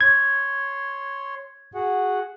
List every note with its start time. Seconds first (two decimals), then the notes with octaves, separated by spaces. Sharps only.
0.01 C#5 C6 G#6
1.75 F#4 G#4 F#5